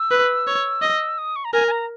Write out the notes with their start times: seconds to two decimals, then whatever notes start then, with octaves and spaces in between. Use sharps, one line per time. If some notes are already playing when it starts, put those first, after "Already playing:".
Already playing: E6
0.11 B4
0.47 C#5
0.82 D#5
1.18 D#6
1.36 C#6
1.45 A#5
1.53 A#4 G#5
1.67 G#5
1.71 A#5